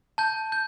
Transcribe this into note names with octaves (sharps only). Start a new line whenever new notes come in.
A5 G6
G6